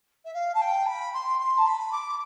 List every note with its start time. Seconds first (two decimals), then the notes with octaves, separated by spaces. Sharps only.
0.25 E5
0.34 F5
0.54 A5
0.61 G5
0.86 B5
1.13 C6
1.39 C6
1.57 A5
1.66 B5
1.92 D6